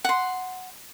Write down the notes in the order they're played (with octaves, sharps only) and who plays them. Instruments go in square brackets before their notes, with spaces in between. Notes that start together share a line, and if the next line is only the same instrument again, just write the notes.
[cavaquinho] F#5 C6